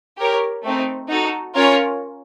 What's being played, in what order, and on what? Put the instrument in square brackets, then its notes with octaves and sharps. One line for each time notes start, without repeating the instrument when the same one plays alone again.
[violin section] G4 A#4 C#5
A3 C4 D#4
D#4 F#4 A4
C#4 F4 A#4 C#5